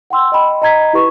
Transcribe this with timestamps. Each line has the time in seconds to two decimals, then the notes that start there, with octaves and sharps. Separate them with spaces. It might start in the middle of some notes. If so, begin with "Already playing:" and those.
0.10 F#5 G5 C6 E6
0.32 D#5 G5 B5
0.62 D#5 A#5 G#6 B6
0.93 E4 G4 B4 C#6